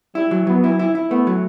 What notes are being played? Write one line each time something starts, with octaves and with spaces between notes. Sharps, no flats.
G3 E4
F#3
F#3 B3
E4
E4
E4
A3 B3
F#3